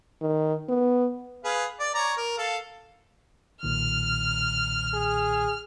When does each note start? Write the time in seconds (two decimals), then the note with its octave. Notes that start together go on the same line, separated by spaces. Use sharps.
0.22 D#3
0.69 B3
1.44 G#4 B4 F5
1.80 D5
1.94 C#5 D5 A#5
2.18 A#4
2.38 A4 F5
3.63 B1 A#2 D#3 F6
4.94 G#4